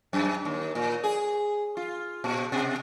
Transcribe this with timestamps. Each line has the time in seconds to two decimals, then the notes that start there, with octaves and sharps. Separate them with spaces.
0.13 F#2
0.45 D#2
0.75 A#2
1.03 G#4
1.77 F4
2.24 A#2
2.52 B2